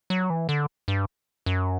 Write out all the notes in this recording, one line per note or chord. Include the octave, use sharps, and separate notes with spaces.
F#3
E3
D3
G2
F#2